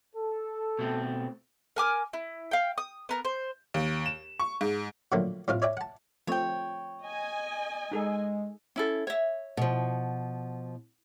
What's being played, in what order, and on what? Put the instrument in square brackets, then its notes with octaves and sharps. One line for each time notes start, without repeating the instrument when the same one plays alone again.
[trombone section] A4
[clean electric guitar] B2 A3 C4
[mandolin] A#4 G#5 D6 F6
E4
F5 G5
D#6
B3 A#4 A#5
C5
[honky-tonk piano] D#2
E7
C#6
G#2
[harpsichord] A#2 D3 F3 F#3 A3 A#3
A2 C3 C4 F4 F5
C#5 D5 E5 G5
F#5 A5
[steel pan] F3 A3 C4 [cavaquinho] C#5 G5
[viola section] D#5 G#5
[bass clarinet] G#3 [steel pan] D#4 G#4 A4
[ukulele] C#4 E4 A4
C#5 E5
[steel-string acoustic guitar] B2 F3